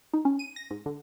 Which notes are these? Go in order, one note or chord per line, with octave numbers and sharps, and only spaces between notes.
D#4
C#4
D#7
A#6
G#2
D3